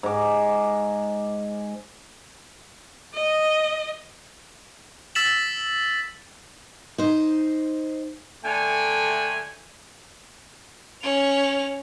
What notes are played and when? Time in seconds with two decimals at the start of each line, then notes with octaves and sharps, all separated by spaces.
0.03 G#2 D6
3.14 D#5
5.15 E6 A6 B6 E7 F#7
6.98 D#4 C5
8.45 D3 A3 G5 G#5
11.02 C#4 F7